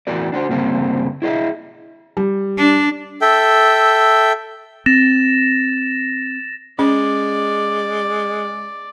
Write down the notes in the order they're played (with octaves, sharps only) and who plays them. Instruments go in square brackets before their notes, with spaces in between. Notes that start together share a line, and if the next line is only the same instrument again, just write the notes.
[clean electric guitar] E2 A2 F#4 A#4 D5
D4 F#4 C5
D2 G2 C#3 A#3 C4
E4 G#4 C5 D#5 E5
[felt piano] G3
[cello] D4
[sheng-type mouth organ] A4 E5 G5
[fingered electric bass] C4 [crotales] A6 A#6 E7
[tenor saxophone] G#3 [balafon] C#4 [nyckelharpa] D5